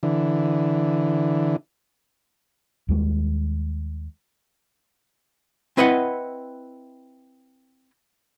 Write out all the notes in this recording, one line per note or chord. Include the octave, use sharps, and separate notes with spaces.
D3 E3
D#2 G3 G#3
C4 E4 B4 D#5 E5 F#5